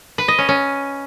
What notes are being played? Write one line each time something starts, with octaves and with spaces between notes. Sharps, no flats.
B4
D#5
C#4
C#4